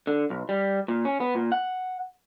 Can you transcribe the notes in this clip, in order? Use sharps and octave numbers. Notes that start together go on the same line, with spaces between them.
D3
B1
G3
A#2
C#4
B3
A#2
F#5